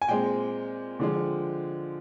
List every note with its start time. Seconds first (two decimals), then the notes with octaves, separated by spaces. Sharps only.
0.02 G#5
0.08 A#2 G#3 C4 G5
1.00 D3 F3 G#3